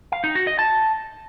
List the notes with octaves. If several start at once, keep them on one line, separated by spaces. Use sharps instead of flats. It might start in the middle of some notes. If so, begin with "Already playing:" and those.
F5
D#4
F#4
D#5
A5